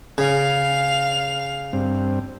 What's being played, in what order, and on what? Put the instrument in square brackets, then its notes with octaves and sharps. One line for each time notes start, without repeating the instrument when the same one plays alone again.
[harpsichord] C#3 [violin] F5 F7
[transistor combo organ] G2 C4